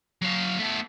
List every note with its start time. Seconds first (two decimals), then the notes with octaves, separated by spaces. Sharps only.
0.22 F#3 F5
0.58 A3 B3